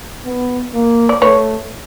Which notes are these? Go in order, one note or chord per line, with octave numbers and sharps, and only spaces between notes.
B3
A#3
D5
A3 B4 C#5